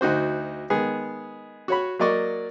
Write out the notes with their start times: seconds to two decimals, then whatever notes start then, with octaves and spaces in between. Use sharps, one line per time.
0.01 D2 D#4 F#4 C5
0.70 D#3 G#3 B3 G#4
1.68 F#4 C#5 B5
1.99 F#3 A#3 A#4 D5 D#5 C#6